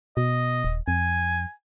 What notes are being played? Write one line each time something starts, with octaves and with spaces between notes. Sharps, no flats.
B2 D#5
D#1
F2 G#5